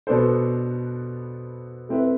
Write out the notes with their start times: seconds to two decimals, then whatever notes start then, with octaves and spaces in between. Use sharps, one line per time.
0.07 B2 B3 D4 A4 C5
1.89 A3 C4 E4 B4 E5